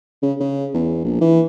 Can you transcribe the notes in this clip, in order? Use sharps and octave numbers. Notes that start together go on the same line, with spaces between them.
C#3
C#3
E2
A#1
E3